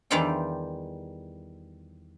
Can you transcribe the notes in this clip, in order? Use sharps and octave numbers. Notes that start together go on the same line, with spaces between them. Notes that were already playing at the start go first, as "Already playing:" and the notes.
E2 D#3 G3 F4 F5 G5